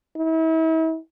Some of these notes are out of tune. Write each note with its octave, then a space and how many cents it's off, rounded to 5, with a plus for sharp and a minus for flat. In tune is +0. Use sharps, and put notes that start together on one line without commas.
E4 -40